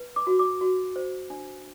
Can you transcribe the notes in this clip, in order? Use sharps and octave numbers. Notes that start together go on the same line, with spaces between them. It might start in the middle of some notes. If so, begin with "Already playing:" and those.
Already playing: B4
D6
F#4
D6
F#4
C5
D4